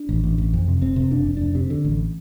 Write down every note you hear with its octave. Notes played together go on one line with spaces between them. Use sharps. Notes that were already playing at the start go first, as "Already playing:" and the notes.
Already playing: D4
A1
A1
A1
F2
C3
F1 C4
C3
F1 D4
F1
F1 D4
C3
D3
A1